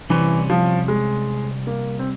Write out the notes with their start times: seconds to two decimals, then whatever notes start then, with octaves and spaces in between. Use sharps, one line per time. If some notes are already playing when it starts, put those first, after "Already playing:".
0.09 C2 C3 E3 G3 C#4
0.50 F3
0.88 G#3
1.67 A#3
1.99 C4